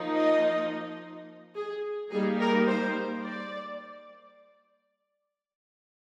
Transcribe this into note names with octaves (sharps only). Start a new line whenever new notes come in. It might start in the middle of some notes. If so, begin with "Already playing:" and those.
Already playing: F3 A#3 D#4
D#5
G#4
G3 A#3 D#4 G#4
A#4
C5
D5